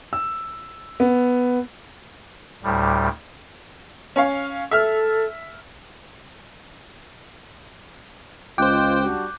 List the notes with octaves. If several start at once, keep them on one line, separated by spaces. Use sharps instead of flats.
E6
B3
D2 A2 G3
C#4 C#5 F5
A4 E5 F6
C#2 F4 C5 D#5 G5 D6 F#6 G6
G3 D4 F#4